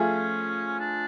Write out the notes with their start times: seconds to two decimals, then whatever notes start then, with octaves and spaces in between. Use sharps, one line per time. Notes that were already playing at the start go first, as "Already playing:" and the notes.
Already playing: F3 A3 C#4 F4 G#4
0.80 D4